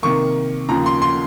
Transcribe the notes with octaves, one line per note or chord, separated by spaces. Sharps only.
C3 D#3 A#3 C#6
D#2 C#3 F3 A#5
C6
C6